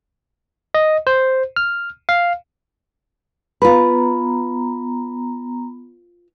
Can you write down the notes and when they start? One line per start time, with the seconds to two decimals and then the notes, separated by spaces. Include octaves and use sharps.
0.74 D#5
1.07 C5
1.56 F6
2.09 F5
3.62 B3 F4 B4 A#5 B5